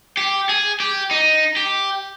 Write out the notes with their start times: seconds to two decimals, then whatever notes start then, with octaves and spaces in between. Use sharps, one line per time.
0.17 G4
0.49 G#4
0.80 G4
1.11 D#4
1.57 G4